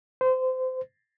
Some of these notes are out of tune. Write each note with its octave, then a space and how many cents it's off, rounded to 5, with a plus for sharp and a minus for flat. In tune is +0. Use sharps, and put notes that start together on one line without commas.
C5 -25